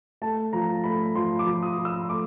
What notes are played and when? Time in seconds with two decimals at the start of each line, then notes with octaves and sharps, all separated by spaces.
0.22 A3 A5
0.53 F3 A#5
0.84 A3 B5
1.15 F3 C6
1.39 D6
1.46 F3
1.63 D#6
1.77 F3
1.85 E6
2.09 A3 D6